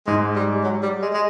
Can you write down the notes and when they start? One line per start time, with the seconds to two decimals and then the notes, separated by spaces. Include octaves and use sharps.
0.07 G#2 G#3
0.35 G3
0.63 F#3
0.83 G3
1.02 G#3
1.13 G#3